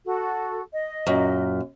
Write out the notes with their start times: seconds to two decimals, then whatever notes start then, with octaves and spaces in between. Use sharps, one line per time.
0.05 F#4 A4
0.72 D#5
1.07 F#2 A#2